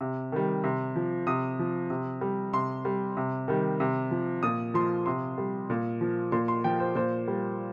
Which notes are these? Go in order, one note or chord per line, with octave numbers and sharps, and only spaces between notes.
C3
D#3 G3
C3
F3
C3 D#6
F3
C3
G3
C3 C6
G3
C3
D#3 G3
C3
F3
A#2 D#6
F3 C6
C3 C6
G3
A#2
F3
A#2 C6
C6
F3 G5
C5
A#2 C5
G3